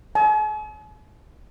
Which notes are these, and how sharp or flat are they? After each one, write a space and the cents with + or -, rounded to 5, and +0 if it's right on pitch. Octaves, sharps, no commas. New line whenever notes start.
G#5 +45